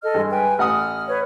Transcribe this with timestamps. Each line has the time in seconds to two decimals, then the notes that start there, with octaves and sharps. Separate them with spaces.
0.02 A4 D#5 F6
0.14 G2 G#3
0.30 B4 G5 G#5
0.59 A1 F#5 D#6 F6
1.07 B4 C#5